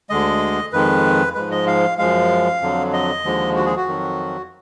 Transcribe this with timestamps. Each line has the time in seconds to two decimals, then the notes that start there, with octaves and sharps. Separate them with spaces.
0.10 D2 D3 G#3 D#5
0.73 F2 D#3 G#3 B4
1.35 G#2 F3 G#3 B4
1.51 D#5
1.67 F5
1.98 F#2 F3 G#3 F5
2.61 F2 D3 F#3
2.93 D#5
3.24 D#2 D3 F3 G#3
3.56 F#4
3.65 G#4
3.76 F#4
3.87 F2 D#3 F#3